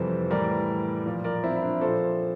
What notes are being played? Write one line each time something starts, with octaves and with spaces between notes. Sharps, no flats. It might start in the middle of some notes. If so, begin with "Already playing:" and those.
Already playing: F2 C3 E3 G3 A4 C5
A2 E3 G3 A#4 D5
A#2 F3
A#4 D5
C4 E4
E4
D4
A#2 F3 A4 C5